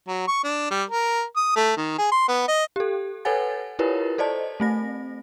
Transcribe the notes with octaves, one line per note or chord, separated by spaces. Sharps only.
F#3
C#6
D4
G3
A#4
D#6
A3
D#3
G#4
C6
B3
D#5
G4 A4
A4 B4 C#5 F#5 G#5 A6
E4 F4 G4 A#4 B4 C#5
A4 C5 D5 D#5 A5
A3 C4 A#6